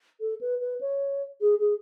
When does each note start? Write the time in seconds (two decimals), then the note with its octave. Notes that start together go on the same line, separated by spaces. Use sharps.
0.20 A4
0.41 B4
0.61 B4
0.81 C#5
1.41 G#4
1.60 G#4